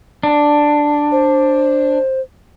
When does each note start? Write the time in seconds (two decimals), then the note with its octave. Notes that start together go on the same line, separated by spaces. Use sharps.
0.23 D4
1.12 C5